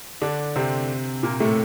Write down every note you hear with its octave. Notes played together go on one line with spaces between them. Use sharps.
D3 D4
C3 C4
A#2 A#3
A2 A3